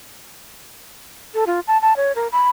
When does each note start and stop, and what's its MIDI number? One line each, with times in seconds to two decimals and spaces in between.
1.34 1.44 69
1.47 1.60 65
1.68 1.80 81
1.82 1.96 81
1.96 2.12 73
2.15 2.28 70
2.32 2.50 83